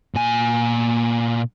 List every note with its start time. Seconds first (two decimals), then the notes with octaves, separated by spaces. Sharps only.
0.15 A#2 G#5